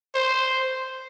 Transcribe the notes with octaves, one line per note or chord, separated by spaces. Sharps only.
C5